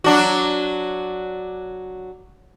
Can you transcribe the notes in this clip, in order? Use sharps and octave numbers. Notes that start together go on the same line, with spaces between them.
F#3 D4 F#4